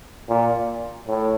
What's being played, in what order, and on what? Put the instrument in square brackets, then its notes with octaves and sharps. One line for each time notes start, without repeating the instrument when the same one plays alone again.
[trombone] A#2
A2